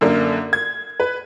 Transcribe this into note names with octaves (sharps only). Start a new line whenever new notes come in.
F#2 D3 A#3
G#6
B4